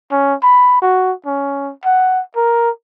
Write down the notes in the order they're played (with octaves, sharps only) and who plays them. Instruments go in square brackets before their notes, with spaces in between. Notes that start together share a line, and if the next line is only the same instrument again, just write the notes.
[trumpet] C#4
B5
F#4
C#4
F#5
A#4